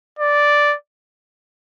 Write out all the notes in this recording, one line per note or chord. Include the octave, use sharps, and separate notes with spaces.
D5